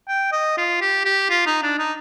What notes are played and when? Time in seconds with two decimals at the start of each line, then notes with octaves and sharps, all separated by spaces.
0.08 G5
0.32 D#5
0.57 F4
0.81 G4
1.05 G4
1.30 F4
1.46 D#4
1.63 D4
1.79 D#4